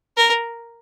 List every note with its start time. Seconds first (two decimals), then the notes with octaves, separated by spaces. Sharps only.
0.17 A#4